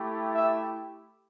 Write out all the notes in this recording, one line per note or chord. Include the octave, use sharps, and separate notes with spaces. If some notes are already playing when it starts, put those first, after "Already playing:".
Already playing: A3 E4 G4
E5